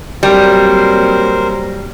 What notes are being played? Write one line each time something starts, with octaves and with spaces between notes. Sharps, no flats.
F#3 G3 A#3 C4 A#4 C5